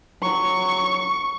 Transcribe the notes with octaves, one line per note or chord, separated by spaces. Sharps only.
F#3 C#6